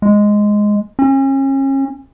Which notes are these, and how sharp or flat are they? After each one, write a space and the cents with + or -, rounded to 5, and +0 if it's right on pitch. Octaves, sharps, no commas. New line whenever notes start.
G#3 +0
C#4 -35